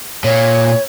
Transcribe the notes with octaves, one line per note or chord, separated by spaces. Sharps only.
A#2 C#5